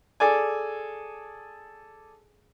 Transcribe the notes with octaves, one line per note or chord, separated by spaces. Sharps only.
G#4 A4 D5 G#5